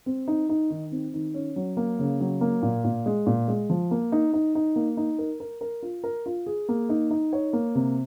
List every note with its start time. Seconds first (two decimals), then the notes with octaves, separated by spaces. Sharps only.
0.06 C4
0.28 D#4
0.49 D#4
0.70 D#3
0.92 C4
1.14 D#3
1.34 C#4
1.56 F#3
1.77 A#3
1.99 C#3
2.20 F#3
2.41 A#3
2.62 A#2
2.84 A#2
3.06 G#3
3.26 A#2
3.48 G#3
3.70 F3
3.91 A#3
4.12 D#4
4.33 D#4
4.55 D#4
4.76 A#3
4.97 D#4
5.19 A#4
5.40 A#4
5.61 A#4
5.83 F4
6.04 A#4
6.26 F4
6.46 G#4
6.69 A#3
6.89 D#4
7.11 D#4
7.33 C#5
7.53 A#3
7.75 C3